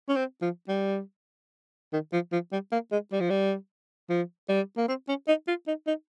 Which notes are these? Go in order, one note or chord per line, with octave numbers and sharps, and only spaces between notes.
C#4
C4
F3
G3
D#3
F3
F3
G3
A#3
G#3
G3
F3
G3
F3
G3
A#3
C4
C#4
D#4
F4
D#4
D#4